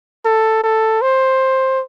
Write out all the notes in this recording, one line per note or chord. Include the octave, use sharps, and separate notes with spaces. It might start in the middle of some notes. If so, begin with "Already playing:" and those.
A4
A4
C5